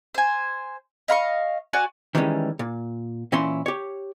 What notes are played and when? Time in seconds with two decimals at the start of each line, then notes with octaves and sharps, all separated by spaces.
0.14 C5 G#5
1.08 D#5 F5 B5 C#6
1.73 F#4 D5 G#5
2.15 D#3 E3 G3 G#3 C#4
2.59 A#2
3.32 A#2 E3 C#4 E4 C6
3.66 G4 C#5